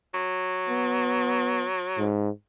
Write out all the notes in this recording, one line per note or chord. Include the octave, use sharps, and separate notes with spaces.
F#3
B3
G#2